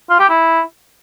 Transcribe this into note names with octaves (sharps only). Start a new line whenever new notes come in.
F4
G4
E4